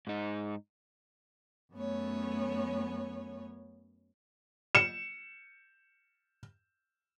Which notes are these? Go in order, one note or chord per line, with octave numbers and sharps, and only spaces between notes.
G#2 D#4
F#2 A3 B3 C#4 C#5
C#7 E7